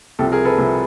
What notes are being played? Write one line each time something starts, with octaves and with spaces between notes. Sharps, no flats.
C2 C3 F3 G4 A4
G#4 A#4
A4 B4
C2 C3 F3